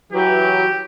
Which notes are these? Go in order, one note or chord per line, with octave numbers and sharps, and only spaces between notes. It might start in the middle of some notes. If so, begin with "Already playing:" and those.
E3 F#3 G4